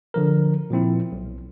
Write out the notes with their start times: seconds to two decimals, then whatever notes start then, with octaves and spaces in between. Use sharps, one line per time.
0.14 D3 F3 A#4
0.70 A#2 F3 C4 E4
1.12 B1